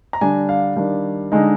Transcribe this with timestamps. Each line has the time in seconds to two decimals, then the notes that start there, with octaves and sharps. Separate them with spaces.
0.13 A#5
0.21 D3 G3 D4 G#5
0.49 F5
0.76 D#3 G3 D4
1.32 D3 G#3 D#4